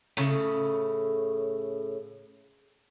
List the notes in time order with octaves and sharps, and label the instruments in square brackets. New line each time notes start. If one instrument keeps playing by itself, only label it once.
[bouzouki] A2 C#3